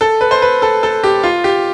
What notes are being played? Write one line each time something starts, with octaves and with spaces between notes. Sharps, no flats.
A4
B4
C5
B4
A4
A4
G4
F4
G4